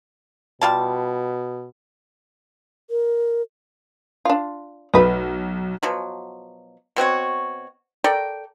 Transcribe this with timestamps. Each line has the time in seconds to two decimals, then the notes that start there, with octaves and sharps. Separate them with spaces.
0.61 B2 G3 F4 A5
2.90 A#4
4.25 D4 F4
4.94 B1 A3 B4 D#5
5.83 B2 F3 F#3
6.96 B2 C4 F#4 C#5
8.04 A4 A#4 D5 G5